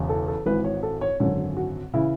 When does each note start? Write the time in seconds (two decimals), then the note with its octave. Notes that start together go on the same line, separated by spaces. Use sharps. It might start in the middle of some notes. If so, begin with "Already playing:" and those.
Already playing: E1 E2 C#3
0.09 A4
0.28 A4
0.46 G#1 G#2 E3 B4
0.64 C#5
0.83 A4
1.01 C#5
1.20 G#1 F#2 D3 C#5
1.57 F#4
1.93 C#3 E3 E4